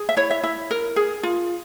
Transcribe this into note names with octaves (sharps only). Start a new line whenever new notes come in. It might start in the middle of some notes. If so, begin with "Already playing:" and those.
Already playing: G#4
E5
E4 C#5
E5
E4 E5
A#4
G#4
F4